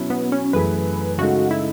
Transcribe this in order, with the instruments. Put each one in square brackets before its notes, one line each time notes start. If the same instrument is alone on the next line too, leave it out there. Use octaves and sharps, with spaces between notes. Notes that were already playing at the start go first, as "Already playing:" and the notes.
Already playing: [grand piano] B2 F#3 C#4 E4
[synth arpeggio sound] B3
C#4
[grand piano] F#2 E3 A3 E4 G#4 [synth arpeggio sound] B4
[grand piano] C#3 G#3 D#4 A4 [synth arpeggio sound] F#4
[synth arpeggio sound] E4